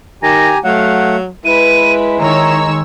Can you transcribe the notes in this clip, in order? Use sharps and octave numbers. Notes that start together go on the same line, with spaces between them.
D#3 G4 G#5 A#5 A#6
F#3 A3 F5 F#5
G#3 E4 B4 D#7
D#3 C#5 A#5 E6